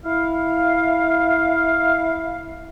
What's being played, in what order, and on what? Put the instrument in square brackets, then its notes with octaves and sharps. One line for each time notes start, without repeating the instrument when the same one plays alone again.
[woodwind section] E4 F5